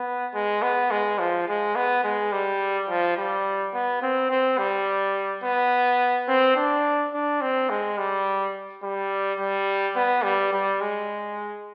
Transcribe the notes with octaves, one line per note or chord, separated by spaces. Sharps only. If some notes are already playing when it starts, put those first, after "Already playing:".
Already playing: B3
G#3
B3
G#3
F3
G#3
B3
G#3
G3
F3
G3
B3
C4
C4
G3
B3
C4
D4
D4
C4
G#3
G3
G3
G3
B3
G3
G3
G#3